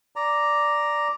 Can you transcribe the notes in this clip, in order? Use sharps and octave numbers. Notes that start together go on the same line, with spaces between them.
D5 A#5